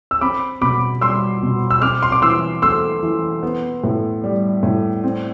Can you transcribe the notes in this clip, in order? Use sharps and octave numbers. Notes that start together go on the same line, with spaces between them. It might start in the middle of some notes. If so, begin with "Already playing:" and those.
E6
C4 B5 D6
B2 B5 D6
G3 C6 E6
B2
E6
C4 D6 F6
C6
D6
E3 C6 E6
A3 C6 E6
E3
B3
A2
G3
A2
C4